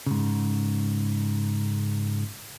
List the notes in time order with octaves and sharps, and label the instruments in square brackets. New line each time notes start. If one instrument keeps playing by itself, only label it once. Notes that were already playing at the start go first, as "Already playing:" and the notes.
[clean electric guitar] G#2 C#3